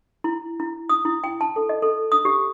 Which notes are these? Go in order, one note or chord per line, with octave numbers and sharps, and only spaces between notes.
E4
E4
D#6
E4
G5
A5
A4
D#5
A4
D#6
G4